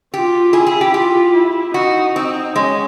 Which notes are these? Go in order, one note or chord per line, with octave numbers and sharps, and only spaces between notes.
F4 G4
E4 G#4
G#4
G4
F4 G4
E4
D#4 F#4
C4
G#3 C#4